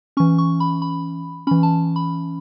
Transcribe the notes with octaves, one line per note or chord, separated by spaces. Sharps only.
E3 C#4 C#6
C#6
B5
B5
E3 C#4 B5
A5
B5